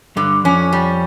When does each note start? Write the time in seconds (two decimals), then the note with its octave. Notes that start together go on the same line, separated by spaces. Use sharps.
0.16 G2 D3 G3
0.44 F2 F3 C#4
0.73 G3